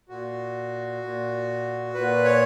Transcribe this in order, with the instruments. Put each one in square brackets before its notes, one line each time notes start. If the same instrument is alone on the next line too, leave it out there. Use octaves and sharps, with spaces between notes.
[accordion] A#2 F#4
A#2
A#2 B4
C#5